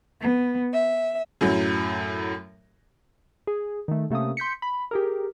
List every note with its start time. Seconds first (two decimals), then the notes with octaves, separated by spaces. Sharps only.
0.20 B3
0.73 E5
1.41 F#2 A2 F#3
3.47 G#4
3.88 D#3 A3
4.10 C3 A3 A#3 C#4 D#6
4.37 C6 G6 B6 C#7
4.62 B5
4.91 G4 G#4 A#4